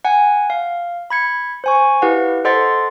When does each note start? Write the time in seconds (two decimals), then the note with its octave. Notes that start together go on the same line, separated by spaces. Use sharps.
0.05 F#5 G#5
0.50 F5
1.10 B5 G#6 C#7
1.64 C5 G#5 C#6
2.02 E4 G4 B4 F5 F#5
2.45 A4 C5 D#5 F#5 C6 A6